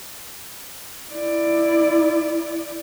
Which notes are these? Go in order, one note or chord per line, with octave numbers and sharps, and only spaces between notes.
E4 D5